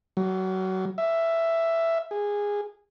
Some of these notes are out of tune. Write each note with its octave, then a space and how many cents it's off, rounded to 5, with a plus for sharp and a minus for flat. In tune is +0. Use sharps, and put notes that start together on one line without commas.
F#3 +25
E5 +5
G#4 -15